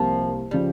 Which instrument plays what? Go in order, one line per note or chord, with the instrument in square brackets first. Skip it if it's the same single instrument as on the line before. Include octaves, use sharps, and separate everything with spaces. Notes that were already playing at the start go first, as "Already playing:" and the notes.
Already playing: [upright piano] C2 C3 G3 A#3 [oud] F3
[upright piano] C#3 F3 [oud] G3